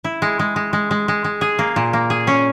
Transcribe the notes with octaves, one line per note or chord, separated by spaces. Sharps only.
E4
G#3
G#3
G#3
G#3
G#3
G#3
G#3
G#4
A#3
A#2
A#3
G#4
C#4